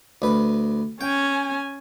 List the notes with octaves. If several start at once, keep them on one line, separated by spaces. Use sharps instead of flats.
D2 B4
C#4 G5 G#5